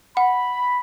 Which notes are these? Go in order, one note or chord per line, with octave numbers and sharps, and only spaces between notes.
F#5 B5